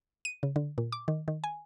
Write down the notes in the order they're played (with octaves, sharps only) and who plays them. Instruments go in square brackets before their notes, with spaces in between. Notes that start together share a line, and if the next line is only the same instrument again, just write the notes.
[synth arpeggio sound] D#7
C#3
D3
A#2
D6
D#3
D#3
G#5